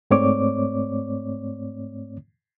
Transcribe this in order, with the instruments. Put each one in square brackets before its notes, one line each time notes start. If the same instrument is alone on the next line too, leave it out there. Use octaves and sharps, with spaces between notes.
[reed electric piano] G#2 A3 C4 C#5 D5 D6